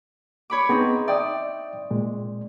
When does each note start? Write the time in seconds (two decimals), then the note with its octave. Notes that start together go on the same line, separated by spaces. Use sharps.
0.50 C#5 B5 D6
0.69 B3 C4 D#4 G#4
1.08 D5 E5 G5 D#6
1.91 A#2 G#3